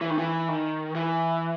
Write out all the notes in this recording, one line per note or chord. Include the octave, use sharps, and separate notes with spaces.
E3
D#3
E3
D#3
E3